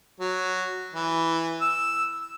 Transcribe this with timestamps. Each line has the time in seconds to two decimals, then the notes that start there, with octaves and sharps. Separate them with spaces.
0.20 F#3
0.93 E3
1.61 E6